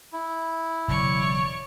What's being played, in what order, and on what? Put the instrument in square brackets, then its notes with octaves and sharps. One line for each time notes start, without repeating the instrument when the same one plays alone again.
[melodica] E4
[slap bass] E1 C#3 F#3 [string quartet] C#5 D5 C#6